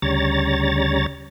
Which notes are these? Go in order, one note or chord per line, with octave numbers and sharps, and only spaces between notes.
D2 C#3 G3 C#5 A#5 A6